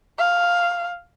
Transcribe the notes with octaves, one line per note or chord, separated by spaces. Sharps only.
F5